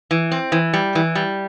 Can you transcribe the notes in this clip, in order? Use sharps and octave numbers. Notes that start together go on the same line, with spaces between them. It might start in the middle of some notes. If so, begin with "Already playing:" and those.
E3
C4
E3
G3
E3
G3